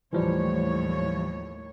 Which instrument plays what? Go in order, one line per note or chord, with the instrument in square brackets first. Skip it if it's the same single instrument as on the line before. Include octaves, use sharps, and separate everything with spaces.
[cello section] D#2 A2 C#5 [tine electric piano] E3 F3 G3